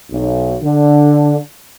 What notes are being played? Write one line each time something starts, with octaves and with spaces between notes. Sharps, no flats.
B1
D3